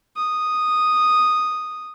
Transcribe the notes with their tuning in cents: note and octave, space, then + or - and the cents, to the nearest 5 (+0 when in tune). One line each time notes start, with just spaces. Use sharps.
D#6 -5